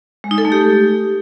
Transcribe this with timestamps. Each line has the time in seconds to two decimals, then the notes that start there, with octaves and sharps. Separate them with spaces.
0.24 G#3
0.31 D#4
0.38 A4
0.45 A3
0.52 G4